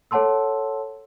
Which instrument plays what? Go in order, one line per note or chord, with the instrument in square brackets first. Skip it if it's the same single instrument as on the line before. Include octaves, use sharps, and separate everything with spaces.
[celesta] A4 C#5 F#5 A5 C6 E6